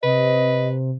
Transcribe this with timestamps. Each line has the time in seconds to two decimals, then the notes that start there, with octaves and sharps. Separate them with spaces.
0.03 C3 B4 D#5